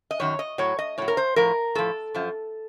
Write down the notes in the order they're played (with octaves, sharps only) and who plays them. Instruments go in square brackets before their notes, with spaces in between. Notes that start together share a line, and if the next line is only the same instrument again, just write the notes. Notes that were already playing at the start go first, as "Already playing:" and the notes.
[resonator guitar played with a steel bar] D#5
F#2 D#3 F#3 C#5
D#5
A2 F#3 C#5
D#5
A2 F#3 C#5
A#4
C5
A2 F3 A#4
A2 F3 A4
F#2 F3